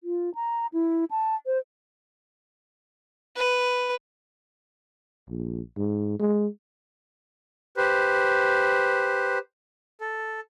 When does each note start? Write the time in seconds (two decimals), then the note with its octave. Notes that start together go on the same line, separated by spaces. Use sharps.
0.03 F4
0.35 A#5
0.73 E4
1.11 A5
1.46 C5
3.36 B4
5.30 A#1
5.78 G#2
6.20 G#3
7.77 G4 B4 C5
10.01 A4